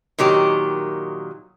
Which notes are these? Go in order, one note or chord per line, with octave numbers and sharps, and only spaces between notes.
A#2 D#3 F#3 G4